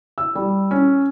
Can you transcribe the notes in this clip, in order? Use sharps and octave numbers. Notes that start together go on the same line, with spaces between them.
E6
G3
C#4